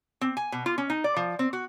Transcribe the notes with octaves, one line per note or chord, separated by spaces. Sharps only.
C4
G#5
B2
F4
C#4
D#4
D5
F3
C4
F#4